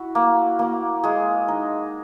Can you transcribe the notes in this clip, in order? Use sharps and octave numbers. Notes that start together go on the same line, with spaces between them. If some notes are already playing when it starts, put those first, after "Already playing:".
Already playing: E4 F#4
A#3
A#3
G#3 G#4
D#4